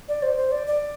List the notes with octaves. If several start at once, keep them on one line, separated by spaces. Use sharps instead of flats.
D5
C5
C5
D5
D5